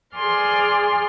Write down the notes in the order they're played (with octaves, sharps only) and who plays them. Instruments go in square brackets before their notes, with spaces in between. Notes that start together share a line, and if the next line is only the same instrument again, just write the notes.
[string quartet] G#4 D5 C6 F6